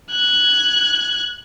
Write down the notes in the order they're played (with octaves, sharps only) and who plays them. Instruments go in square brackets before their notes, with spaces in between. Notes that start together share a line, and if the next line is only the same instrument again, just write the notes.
[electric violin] F#6 G#6